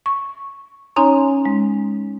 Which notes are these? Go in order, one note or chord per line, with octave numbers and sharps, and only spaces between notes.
C#6
C#4 D#4 C#5 G#5 A#5 C6
G#3